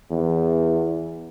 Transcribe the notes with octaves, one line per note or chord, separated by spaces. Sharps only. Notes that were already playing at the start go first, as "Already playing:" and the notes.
E2